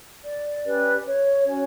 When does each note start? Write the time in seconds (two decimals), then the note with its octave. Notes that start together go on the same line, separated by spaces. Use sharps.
0.25 D5
0.65 C#4 G4 B4
1.06 C#5
1.46 C#4 F#4 C#5